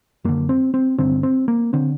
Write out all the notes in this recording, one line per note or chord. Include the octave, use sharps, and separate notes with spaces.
F#2 D3 A#3
C4
C4
G2 D3 C4
C4
A#3
D3 C4